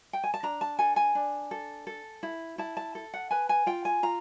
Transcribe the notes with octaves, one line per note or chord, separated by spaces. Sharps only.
G5
G#5
A5
D4 A#5
A5
A4 G#5
G#5
D4
A4
A4
E4
E4 A5
A5
A4
F#5
B4 G#5
G#5
F4 G5
G#5
F4 A#5